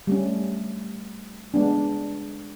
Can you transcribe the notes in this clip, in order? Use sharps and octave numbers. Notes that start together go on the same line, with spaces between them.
G3 A3 C#4
G#3 B3 D4